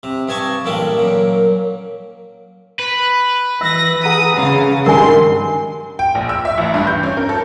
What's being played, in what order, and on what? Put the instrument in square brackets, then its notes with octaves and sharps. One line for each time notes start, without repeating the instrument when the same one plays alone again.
[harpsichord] C3
G2 D#5 G#5 A5 C#6
A1 A#2 G3 A4 D#5
F#2 A#2
[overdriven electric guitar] B4
[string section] E3 A#6 [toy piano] E5 [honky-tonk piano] E6
[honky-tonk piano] G#4 F#5 A#5 [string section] D#6
[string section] C#3 F5
[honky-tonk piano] G2 D#3 G#3 [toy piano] A#4 G#5 [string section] C6
[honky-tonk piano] G5
A#1
E6
E5
A1
G2
G6
C#4
A#4
A4